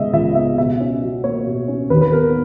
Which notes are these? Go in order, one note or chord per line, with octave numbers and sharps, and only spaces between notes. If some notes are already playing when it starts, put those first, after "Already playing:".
Already playing: C#3 G#3 B3 D#5 E5
C#2 E5
B3 E5
B2 E5
C#4
F#3
A#3 C#5
B2
C#4
D#2 B4
B4
B3 A#4